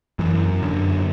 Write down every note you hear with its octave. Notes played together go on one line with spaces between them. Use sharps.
F#2 E3
F#2 D3